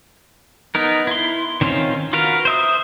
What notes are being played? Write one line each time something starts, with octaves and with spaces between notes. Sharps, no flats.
B3 D#4 A#4
E4 C6
D#3 C4 C#4 F4
F4 F#4 A#4 B4 F5
C5 E5 D#6